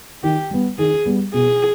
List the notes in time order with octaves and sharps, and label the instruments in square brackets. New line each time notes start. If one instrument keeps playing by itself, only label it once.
[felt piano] D#3 [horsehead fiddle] G4
[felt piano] G3 B3
[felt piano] D#3 [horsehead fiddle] G#4
[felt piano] G3 B3
[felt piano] B2 [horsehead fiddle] G#4